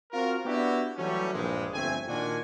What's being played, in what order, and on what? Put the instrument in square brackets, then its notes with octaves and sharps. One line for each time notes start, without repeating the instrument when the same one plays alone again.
[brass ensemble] C4 F4 F#4 A#4
B3 D4 E4 F#4 G4
E3 F#3 G3 A3 C#4
A#1 G2 G#3
G1 F2 A3 C4 G#5
A#2 D#3 D4 F4 F#4 G#5